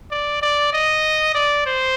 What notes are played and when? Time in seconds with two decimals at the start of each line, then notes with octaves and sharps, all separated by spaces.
0.11 D5
0.42 D5
0.73 D#5
1.35 D5
1.66 C5